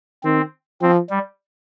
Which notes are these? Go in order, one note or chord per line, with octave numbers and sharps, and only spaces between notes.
D#3 C4
F3 C4
G3